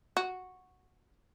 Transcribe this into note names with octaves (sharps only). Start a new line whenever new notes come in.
F#4